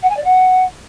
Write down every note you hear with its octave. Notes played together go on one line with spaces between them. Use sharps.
F#5
G#5
D5
F#5